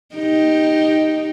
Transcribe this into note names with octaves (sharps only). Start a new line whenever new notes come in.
D#4 G4